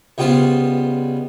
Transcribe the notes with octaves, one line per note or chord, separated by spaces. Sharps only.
C#2 G3 B3 F4 C5